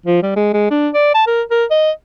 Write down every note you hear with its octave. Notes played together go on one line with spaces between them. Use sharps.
F3
G3
G#3
G#3
D4
D5
A5
A#4
A#4
D#5